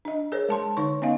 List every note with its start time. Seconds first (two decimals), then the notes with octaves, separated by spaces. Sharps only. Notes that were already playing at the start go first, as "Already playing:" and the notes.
0.05 D4 D#5
0.32 G#4 A#4 C5 C#5
0.49 G#3 A5 C6
0.77 D3 D#4 C#5 C#6
1.02 B3 C#4 D#4 D#5 F5